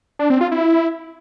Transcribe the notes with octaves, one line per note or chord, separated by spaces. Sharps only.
D4
C4
F4
E4